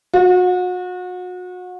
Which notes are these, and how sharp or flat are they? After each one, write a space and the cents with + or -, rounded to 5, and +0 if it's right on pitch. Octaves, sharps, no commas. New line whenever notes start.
F#4 -35